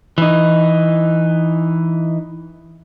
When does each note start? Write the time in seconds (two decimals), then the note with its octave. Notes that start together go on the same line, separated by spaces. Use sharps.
0.18 E3 D#4